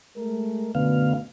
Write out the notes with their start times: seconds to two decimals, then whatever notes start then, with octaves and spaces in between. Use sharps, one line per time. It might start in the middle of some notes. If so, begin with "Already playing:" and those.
0.17 G#3 A3 A#4
0.75 F#2 B2 D3 A3 B3 F5